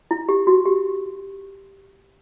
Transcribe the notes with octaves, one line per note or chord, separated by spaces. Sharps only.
E4
G4
F#4
G4